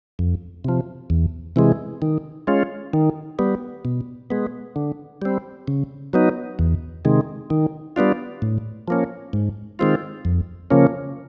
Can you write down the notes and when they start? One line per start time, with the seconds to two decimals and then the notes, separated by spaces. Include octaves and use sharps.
0.19 F2
0.65 C3 F3
1.10 E2
1.56 C3 E3 G#3
2.02 D#3
2.47 G#3 C#4 F4
2.93 D#3
3.39 G3 B3
3.85 B2
4.30 G#3 B3
4.76 D3
5.22 G3 C4
5.68 C#3
6.13 F#3 B3 D#4
6.59 E2
7.05 C3 D#3 G#3
7.50 D#3
7.96 G3 B3 D4 F4
8.42 A2
8.88 F3 A#3 C#4
9.33 G#2
9.79 D#3 G#3 C4 F4
10.25 F2
10.71 C#3 F3 A#3 C#4